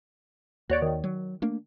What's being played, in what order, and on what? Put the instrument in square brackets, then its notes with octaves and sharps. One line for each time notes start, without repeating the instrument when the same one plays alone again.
[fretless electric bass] D#2 [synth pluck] F#4 C#5 D5
[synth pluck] D#3
[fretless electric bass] F#3
A3 A#3 D4